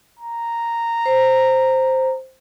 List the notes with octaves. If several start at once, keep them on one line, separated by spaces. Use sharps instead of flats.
A#5
C5